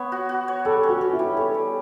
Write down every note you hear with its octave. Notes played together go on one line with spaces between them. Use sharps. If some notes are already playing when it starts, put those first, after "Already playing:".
Already playing: B3 C#5
F#4
F#4
C#5
G3 A4
C#4
F#4
C#4
E4
G3
C#4 A4
G3